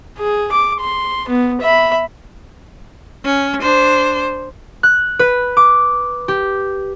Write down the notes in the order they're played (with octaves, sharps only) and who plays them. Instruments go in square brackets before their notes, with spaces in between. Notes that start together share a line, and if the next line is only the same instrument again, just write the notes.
[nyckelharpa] G#4
D6
C6
B3
E5 B5
[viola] C#4
D4 C5
[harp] F#6
B4
D6
G4